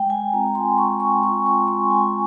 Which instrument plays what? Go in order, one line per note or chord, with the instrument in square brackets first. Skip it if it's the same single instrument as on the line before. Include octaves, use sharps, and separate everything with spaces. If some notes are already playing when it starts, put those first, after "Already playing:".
Already playing: [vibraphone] G#3 G5
G#5
C4 F4 A#5
C6
G#3 C#6
C#6
C4 F4 C#6
C#6
G#3 C6
G#5